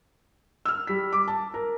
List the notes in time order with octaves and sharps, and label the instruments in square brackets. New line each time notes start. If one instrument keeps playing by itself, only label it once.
[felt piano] E6 F6
G3 B6
D6
A5
A#4